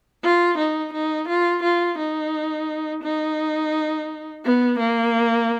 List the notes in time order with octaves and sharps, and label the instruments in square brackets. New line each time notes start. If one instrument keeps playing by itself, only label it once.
[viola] F4
D#4
D#4
F4
F4
D#4
D#4
B3
A#3